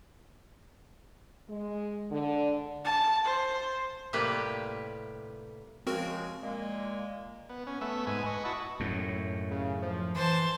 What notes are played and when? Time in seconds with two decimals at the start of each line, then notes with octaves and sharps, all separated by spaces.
1.49 G#3
2.10 D3
2.84 A5
3.25 C5
4.13 A2 C3 G3 A#3 G4 B4
5.87 C#3 F3 G#3 C4 F#4 A#4
6.43 A#2 G#3 A#3
7.49 B3
7.67 C#4
7.81 A3 B3 E5
8.07 G#2 B4 G#5
8.26 B4 D#5 C#6
8.45 E4 F#4 D#5 A5 C#6
8.80 F#2 A2
9.51 C#3
9.82 F3
10.15 E3 C5 A5